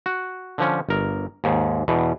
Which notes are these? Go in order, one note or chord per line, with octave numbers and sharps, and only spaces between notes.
F#4
D3 F3 C#4
G1 A#4
D#2 G#2
E2 B2